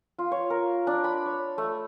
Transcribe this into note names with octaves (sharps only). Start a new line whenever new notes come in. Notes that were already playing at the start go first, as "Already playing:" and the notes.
F4
C#5
A#4
D4
B5
C#5
A3